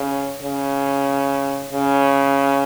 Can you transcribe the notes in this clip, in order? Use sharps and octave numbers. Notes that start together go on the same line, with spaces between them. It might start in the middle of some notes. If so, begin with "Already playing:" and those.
Already playing: C#3
C#3
C#3